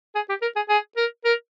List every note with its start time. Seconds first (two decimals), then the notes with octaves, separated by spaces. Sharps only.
0.15 G#4
0.29 G4
0.42 A#4
0.56 G#4
0.69 G#4
0.97 A#4
1.25 A#4